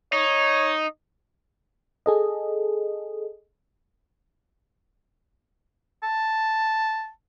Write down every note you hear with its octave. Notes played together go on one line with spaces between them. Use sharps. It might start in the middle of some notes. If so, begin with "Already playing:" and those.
D#4 C#5
G#4 A4 D#5
A5